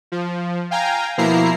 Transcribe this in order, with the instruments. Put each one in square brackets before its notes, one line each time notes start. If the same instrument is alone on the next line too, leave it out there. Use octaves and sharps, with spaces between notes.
[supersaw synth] F3
F5 G5 G#5 A#5
B2 F3 A#3 E4 A#5 C7